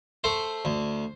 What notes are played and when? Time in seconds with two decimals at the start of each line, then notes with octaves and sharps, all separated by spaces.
0.24 A3 C5
0.65 D2